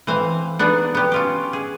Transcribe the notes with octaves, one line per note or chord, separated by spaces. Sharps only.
E3 C4 C5 E5 F5
B3 D4 D#4 G#4
B3 G4
C#4 F4 G4
G#4